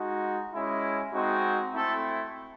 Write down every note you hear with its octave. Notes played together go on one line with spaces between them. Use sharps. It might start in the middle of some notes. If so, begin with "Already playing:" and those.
Already playing: G#3 D#4 F#4
G#3 C#4 E4
G#3 C4 D#4 F#4
A3 C4 E4 A4